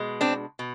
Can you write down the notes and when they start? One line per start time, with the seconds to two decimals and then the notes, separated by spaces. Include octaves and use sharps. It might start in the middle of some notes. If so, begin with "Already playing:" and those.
Already playing: B2 G#3
0.21 C4 D4
0.59 B2